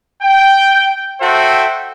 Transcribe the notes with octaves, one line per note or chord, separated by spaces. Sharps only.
G5
F#4 A4 C5 E5 G5